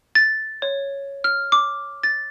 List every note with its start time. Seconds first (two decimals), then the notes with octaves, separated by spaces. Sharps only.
0.15 A6
0.62 C#5
1.24 F6
1.52 D6
2.03 A6